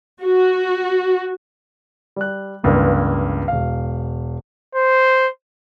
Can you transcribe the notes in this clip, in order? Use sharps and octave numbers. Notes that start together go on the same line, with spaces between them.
F#4
G3 F#6
G1 C#2 G2 E3 A#3 B4
E1 F5
C5